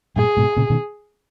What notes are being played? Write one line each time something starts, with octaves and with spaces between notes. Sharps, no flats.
G2 A#2 G#4
G#2 B2
A#2 C#3
B2 D#3